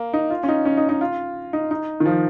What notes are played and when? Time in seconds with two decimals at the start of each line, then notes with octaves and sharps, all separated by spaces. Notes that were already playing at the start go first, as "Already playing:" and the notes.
Already playing: A#3
0.13 D#4
0.30 F4
0.43 C#4
0.49 D#4
0.65 C#4
0.77 D#4
0.89 D#4
1.01 F4
1.53 D#4
1.71 D#4
2.00 D#3
2.06 F3